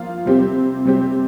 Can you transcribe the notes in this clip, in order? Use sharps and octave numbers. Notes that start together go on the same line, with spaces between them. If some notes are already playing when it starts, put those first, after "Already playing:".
Already playing: F3 A#3 F4
C3 G3 C4 G4
C3 G3 C4 G4